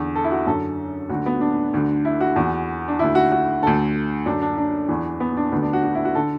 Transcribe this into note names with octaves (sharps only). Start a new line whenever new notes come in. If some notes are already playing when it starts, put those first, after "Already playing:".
Already playing: E2 D3
A4
E4
F#4
F#2 D3 A4
D2 D3 F#4
B3
D4
D2 D3
E4
F#4
E2 E3
D4
D2 D3 E4
F#4
F#4
D2 D3 A4
F#2 D3 D4
D4
D4
E2 E3
B3
D4
D2 D3 B3
D4
F#4
F#4
E4
F#4
D3 A4